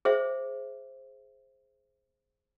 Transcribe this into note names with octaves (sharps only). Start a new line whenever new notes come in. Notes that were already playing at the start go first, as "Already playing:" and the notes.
G#4 C5 E5